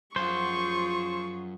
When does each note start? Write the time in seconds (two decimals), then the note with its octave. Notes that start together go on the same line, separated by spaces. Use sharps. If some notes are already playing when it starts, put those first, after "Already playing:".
0.16 F#2 F3 F4 G#4 C5 C#6